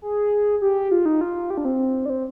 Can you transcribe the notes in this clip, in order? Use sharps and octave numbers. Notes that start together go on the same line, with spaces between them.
G#4
G4
F4
D#4
F4
G4
D4
C4
D4
C4